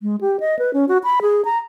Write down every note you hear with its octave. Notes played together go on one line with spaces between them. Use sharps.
G#3
G4
D#5
B4
C#4
F#4
B5
G#4
A#5